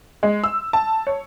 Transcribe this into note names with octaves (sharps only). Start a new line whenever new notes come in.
G#3
E6
A5
C#5